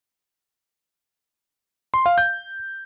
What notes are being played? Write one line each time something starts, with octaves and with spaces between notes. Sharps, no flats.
C6
F5
G6